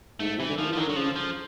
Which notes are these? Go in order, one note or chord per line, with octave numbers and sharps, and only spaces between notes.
G#2 A3
G#2
C3 E3
D3
D#3 F3
E3
F3
D#3 F#3
D3 F#3
C#3 F3
F3